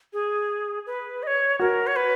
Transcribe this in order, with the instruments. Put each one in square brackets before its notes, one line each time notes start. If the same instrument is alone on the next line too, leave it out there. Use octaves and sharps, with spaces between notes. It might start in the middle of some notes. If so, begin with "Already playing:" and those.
[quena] G#4
B4
D#5
C#5
[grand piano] F#4 [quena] A#4
[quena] C#5
B4